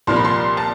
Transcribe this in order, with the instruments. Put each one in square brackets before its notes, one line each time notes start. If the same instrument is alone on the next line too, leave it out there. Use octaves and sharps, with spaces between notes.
[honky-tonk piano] C2 A#2 F3 A#3 C6
B5
C6
A5